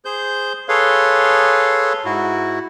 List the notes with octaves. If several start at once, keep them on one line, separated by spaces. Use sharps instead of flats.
G#4 C5 G6
G#4 A4 B4 C#5 F5 C6
G#2 E4 F#4